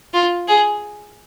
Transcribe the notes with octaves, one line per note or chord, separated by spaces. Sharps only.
F4
G#4